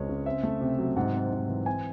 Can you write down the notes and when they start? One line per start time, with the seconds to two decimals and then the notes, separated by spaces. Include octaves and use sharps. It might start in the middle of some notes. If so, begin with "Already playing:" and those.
Already playing: C#2 G#3 C4 C#5
0.09 C#3
0.26 C4 E5
0.43 A3
0.61 C3
0.79 F#3
0.96 G#2 F#5
1.13 C4
1.32 G#2
1.48 E3
1.66 C4 G#5